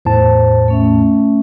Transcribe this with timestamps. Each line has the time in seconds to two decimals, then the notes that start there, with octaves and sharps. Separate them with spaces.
0.05 E2 A2 C5 A5
0.68 A3 C#4 E5